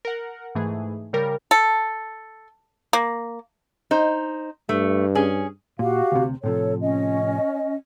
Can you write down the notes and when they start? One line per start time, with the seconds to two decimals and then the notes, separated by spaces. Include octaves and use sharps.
0.05 A#4 F#5
0.55 G#2 E3 A3 G#4
1.13 C#3 G3 A#4
1.51 A4
2.93 A#3
3.91 D#4 C5
4.69 G2 A3
5.15 C#4 G#4
5.79 A#2 F#4 G4 F5
6.12 D2 C3
6.44 A2 C3 F3 A4 C#5
6.81 C#4 D#5